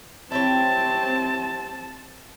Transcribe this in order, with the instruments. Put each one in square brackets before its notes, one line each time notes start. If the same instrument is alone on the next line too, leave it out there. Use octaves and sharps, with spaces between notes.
[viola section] C4 [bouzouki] E4 G4 C#5 [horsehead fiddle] A5